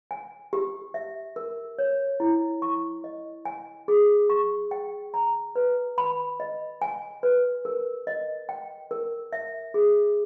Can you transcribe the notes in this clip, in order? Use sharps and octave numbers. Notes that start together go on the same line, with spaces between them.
G#5
G4
E5
A#4
C#5
E4
C#6
D#5
G#5
G#4
C#6
G5
A#5
B4
B5
D#5
G#5
B4
A#4
D#5
G5
A#4
E5
G#4